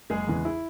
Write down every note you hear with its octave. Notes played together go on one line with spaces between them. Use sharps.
F#1 G#3 G#4
E2 C#3 E3 G#3
E4